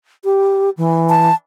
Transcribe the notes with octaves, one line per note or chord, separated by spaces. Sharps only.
G4
E3
A5